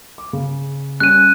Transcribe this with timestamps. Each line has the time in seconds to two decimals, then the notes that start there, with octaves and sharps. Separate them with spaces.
0.18 D6
0.33 C#3
1.00 G3 C#4 F#6 D#7